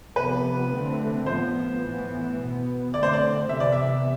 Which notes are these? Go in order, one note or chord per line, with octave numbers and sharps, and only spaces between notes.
C3 F3 B3 B4
D3 A3 C4
A2 F3 B3 C5
A2 E3 B3
B2 B3
D3 A3 C4 D5
C5
D5
C3 E3 B3 E5
D5
E5